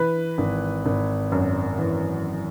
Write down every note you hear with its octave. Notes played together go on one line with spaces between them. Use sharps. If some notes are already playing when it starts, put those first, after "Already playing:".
Already playing: E3 B4
G#1
G#1
F#2
E3